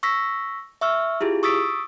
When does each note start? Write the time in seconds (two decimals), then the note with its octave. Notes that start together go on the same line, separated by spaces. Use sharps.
0.03 C#6 E6 A#6 B6
0.81 E5 C#6 E6 F6
1.21 E4 F4 G4 G#4
1.43 C#6 D#6 E6 A6 B6 D7